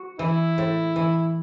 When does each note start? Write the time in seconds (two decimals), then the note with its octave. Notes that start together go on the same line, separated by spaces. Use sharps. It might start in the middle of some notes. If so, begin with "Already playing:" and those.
Already playing: F#4
0.19 E3 E4
0.58 A2
0.96 E3